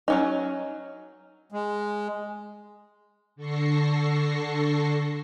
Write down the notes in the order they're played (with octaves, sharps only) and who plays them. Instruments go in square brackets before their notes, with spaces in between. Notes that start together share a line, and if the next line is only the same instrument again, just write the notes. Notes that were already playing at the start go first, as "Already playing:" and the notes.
[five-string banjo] F#3 C#4 D#4
[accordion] G#3
[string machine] D3 A4 C#6 A#6 C7